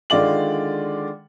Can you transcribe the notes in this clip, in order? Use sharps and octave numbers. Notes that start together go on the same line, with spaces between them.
D3 D#3 G#3 F4 D5 F#7